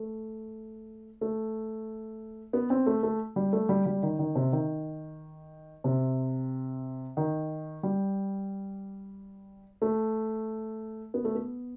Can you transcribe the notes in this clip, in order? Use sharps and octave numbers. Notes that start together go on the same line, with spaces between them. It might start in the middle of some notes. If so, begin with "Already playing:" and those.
Already playing: A3
A3
B3
C4
A3
A3
G3
A3
G3
G3
D#3
D#3
C3
D#3
C3
D#3
G3
A3
B3
A3
B3